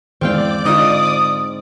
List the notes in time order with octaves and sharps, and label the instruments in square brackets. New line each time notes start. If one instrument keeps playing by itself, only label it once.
[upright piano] E2 G#2 [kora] C4 F5 G5 [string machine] D5 D6
[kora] G#2 [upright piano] D3 F4 [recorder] D#6